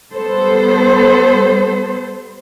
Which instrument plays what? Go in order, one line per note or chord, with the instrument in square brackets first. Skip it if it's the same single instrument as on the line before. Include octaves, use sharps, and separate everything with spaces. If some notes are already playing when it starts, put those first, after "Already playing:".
[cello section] G3 B3 A4 C5